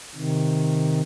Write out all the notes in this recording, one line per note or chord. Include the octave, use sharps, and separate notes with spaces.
C3 D#3